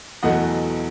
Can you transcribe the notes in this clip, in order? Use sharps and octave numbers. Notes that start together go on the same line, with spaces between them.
E2 B2 F#3 A3 D#5 F#5